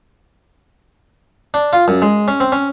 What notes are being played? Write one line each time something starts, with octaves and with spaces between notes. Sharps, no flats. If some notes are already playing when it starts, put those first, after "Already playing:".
D4
F4
F#2
G#3
C#4
C4
C#4